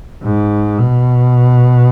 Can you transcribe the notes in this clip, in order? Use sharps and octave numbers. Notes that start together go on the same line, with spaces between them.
G#2
B2